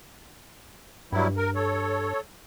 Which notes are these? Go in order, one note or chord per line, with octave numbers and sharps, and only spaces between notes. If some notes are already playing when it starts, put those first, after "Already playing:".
G2 F#3 G3 E4
A#4
A4 C#5